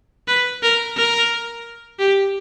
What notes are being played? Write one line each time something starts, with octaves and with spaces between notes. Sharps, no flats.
B4
A#4
A#4
G4